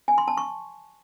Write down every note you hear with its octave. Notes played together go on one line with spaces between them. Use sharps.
G#5
C6
A5
C#6